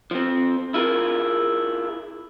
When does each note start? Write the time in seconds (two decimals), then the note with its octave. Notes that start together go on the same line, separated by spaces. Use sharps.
0.11 F3 C4
0.74 E4 F4 G#4 A#4